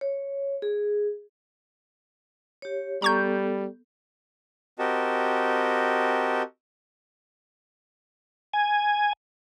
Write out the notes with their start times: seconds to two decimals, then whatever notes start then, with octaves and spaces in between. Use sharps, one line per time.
0.01 C#5
0.62 G#4
2.62 G4 C#5
3.02 G3 B3 A4 A#5 C#6 G6
4.79 C4 F#4 G4 A#4 D#5 A5
8.53 G#5